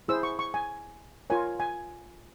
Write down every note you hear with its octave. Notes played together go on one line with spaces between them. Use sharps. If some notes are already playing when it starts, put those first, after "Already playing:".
E4 G#4 C5 E6
C#6
C#6
G#5
F4 A#4 C#5 G#5
G#5